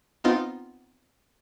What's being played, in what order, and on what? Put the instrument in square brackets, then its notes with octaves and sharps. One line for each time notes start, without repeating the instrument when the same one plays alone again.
[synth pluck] B3 C4 D#4 F4